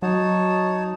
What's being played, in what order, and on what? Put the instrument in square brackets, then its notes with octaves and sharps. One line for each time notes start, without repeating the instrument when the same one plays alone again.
[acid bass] F#3 [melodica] D#4 C#5 A5